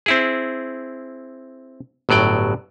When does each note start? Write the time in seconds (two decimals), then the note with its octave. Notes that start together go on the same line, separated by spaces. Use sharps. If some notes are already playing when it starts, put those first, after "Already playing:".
0.06 C4 E4 G#4
2.09 G1 A2 F#3 D5 G5